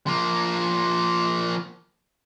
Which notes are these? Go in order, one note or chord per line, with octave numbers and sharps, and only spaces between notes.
F3 A#3